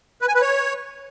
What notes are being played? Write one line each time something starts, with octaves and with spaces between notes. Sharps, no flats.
B4
G#5
B4
C#5